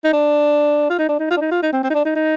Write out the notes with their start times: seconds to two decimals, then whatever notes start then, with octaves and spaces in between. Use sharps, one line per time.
0.04 D#4
0.13 D4
0.90 F4
0.98 D#4
1.09 D4
1.19 D#4
1.30 F4
1.37 D4
1.41 D#4
1.51 F4
1.62 D#4
1.73 C4
1.83 C4
1.90 D#4
1.94 D4
2.05 D#4
2.15 D#4